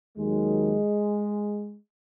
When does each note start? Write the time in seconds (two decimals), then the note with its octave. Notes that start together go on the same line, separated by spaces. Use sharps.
0.17 D#2 D#3 F#3 G#3